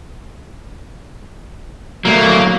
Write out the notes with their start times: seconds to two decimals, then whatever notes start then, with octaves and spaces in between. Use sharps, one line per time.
2.05 F#3 A3 A#3